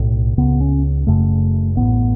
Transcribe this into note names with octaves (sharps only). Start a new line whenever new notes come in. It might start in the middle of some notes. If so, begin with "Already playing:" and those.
Already playing: B1 A2
C#2 C#3 B3
C#4
F#1 F#2 C#3 A3
A1 A2 B3